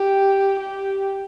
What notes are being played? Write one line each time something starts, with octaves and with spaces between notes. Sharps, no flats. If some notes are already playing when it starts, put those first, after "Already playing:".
Already playing: G4
G4